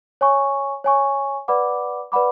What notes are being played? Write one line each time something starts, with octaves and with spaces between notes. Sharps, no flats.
C#5 G#5 C#6
C#5 G#5 C#6
B4 D5 F#5 B5 D6
B4 D5 F#5 B5 D6